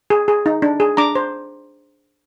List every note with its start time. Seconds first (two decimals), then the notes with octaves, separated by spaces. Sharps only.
0.10 G#4
0.28 G#4
0.46 D#4
0.62 D4
0.80 G#4
0.97 D4 A#5 D6
1.15 C5